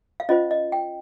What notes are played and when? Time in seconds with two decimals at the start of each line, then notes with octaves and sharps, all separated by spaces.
0.20 F5
0.29 C#4 F4 C5 D#5
0.51 D#5
0.72 G5